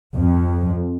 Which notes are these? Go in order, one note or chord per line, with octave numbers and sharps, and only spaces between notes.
F2